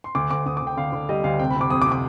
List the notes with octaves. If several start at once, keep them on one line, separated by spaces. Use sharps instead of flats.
C6
D2 D6
D2 D6
D2 D#6
D6
D2
G5
D3 F5
D3
G3 D#5
D2 F5
C3 G5
B5
C3 D6
F2 D#6
D6
C3
D6